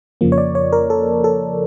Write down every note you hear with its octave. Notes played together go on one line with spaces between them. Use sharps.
F2 C#3 F3 A#3
C#5
D5
C#5
A#4
A4
A4